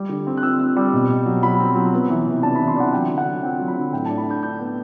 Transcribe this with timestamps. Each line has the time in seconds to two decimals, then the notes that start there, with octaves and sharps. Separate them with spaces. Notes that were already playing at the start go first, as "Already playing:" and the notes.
Already playing: G3
0.09 D3
0.27 C4
0.37 F#6
0.43 C4 E6
0.60 C4
0.76 G3
0.93 B2
1.10 B2
1.26 F#3
1.43 F#3 B5
1.60 C4
1.76 F#3
1.93 B3
2.10 E3
2.26 C3
2.43 D4 A5
2.55 B5
2.60 E3
2.68 C6
2.76 D4 F#5
2.93 F#3 G5
3.10 D3
3.18 F#5
3.26 F#3
3.43 C4 G5
3.60 F#3
3.68 B5
3.76 D3
3.93 A2 G5
4.06 A5
4.09 D4
4.18 B5
4.26 D4 G6
4.43 D4 G6
4.59 B3